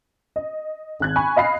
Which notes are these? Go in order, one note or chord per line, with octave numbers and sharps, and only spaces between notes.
D#5
G#1 F#6 G#6
G#5 B5 C#6
D#5 F5 B5 C7